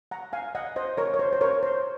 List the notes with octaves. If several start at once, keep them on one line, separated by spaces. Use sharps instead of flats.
F#5 A#5
F5 G#5
D#5 F#5
C5 D#5
A#4 C#5
C#5
C5
C5
A#4 C#5
C5